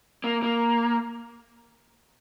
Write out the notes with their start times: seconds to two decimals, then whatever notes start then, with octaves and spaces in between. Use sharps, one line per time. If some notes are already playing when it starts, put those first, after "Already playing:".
0.24 A#3
0.43 A#3